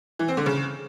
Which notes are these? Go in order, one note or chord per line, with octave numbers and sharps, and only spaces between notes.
E3
C4
D3
C#3